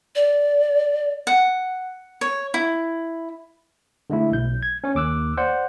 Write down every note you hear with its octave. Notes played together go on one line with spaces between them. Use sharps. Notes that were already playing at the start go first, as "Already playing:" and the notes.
D5
F#5
C#5
E4
D3 G#3 A3 E4
B1 G6
G#6
C#4 C#5
D#2 D6 E6 F#6
C5 D5 F#5